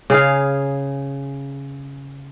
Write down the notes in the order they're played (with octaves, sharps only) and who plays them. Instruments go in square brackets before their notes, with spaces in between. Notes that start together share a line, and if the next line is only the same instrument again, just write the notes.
[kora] C#3 G#4 F5